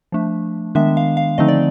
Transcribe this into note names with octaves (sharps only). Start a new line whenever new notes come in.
F3 A3 D4
D#3 G#3 B3 D4 E5
F5
F5
D3 F3 A3 C4 D#4 D#5
D5